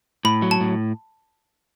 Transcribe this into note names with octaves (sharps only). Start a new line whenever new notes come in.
A2 B5
F#3
A5
A2